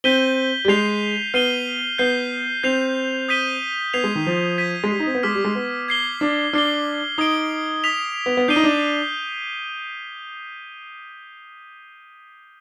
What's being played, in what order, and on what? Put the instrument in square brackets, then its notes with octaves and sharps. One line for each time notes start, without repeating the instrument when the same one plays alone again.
[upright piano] C4 [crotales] G6 B6 D#7 G7
[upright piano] G3
[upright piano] G#3 [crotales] G6 C7 F7
[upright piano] B3 [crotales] F6 C7 D#7 G7
[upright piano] B3 [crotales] G6 C7 G7
[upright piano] C4 [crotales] G6 C7 F7
[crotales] D#6 G6 B6 D#7 G7
[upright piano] B3 [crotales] G#6 C7 F7
[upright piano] G#3
D#3
F3
[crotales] G#6 B6 D#7
[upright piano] G#3
G3
D#4
C4
B3
[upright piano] G#3 [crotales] D6 F6 B6
[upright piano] G3
G#3
B3
[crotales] G#6 C7 G7
[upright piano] D4
[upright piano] D4 [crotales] F6 C7 G7
[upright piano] D#4 [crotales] D#6 G#6 D7 G7
[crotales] D#6 B6 F7
[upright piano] B3
B3
[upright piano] D4 [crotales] G6 C7 D#7 G7
[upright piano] D#4
D4